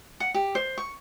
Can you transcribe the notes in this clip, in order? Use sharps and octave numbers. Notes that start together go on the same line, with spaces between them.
F#5
G4
C5
C#6